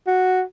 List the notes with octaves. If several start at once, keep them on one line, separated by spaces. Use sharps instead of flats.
F#4